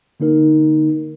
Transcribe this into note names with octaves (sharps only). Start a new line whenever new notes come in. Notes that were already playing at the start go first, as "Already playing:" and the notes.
D3 A#3 D#4 A#4